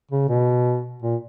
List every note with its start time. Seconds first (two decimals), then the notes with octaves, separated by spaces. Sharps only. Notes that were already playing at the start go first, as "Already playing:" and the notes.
0.11 C#3
0.29 B2
1.03 A#2